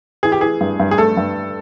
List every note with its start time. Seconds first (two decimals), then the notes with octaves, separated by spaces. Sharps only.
0.23 E3 G#4
0.32 G4
0.41 E3 G#4
0.61 G2
0.79 G2
0.91 G#4
0.98 A3 A4
1.17 G2